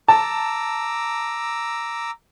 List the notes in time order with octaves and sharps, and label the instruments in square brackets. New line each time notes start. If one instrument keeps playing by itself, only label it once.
[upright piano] A5 [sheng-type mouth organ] A#5 D6 E6